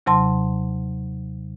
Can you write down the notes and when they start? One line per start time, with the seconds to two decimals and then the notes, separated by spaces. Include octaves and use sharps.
0.06 D#2 C3 F#3 A5 C6